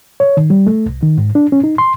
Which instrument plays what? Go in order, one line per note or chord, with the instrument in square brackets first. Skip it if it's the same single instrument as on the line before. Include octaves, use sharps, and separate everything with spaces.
[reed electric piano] C#5
D#3
G3
A3
C2
D#3
G#2
D4
C#4
D#4
C6